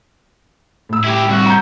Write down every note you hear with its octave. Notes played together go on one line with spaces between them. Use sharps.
A2 E6
E4 G4
C2 F#4
A#5 G6